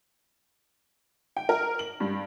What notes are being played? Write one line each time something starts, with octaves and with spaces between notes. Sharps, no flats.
G5
A#4
F#7
G2